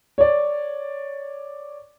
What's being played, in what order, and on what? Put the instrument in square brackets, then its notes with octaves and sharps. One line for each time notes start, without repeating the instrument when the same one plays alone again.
[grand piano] C#5 D5